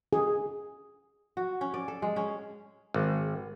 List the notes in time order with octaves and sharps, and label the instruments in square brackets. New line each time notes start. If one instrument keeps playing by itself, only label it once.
[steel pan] G#4
[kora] F#4
C#4
D5
A4
G#3
C#4
[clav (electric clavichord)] G#1